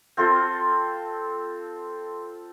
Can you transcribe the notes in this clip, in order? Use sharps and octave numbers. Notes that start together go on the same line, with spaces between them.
C4 F4 A4 C5